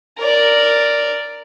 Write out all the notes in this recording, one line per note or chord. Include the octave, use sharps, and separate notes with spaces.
A#4 D5